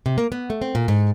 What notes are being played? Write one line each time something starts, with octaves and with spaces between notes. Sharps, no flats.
C3
A#3
B3
A3
C4
A#2
G#2